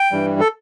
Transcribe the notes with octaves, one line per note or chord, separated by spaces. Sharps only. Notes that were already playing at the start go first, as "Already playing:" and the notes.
Already playing: G5
G2 E3 G3
A4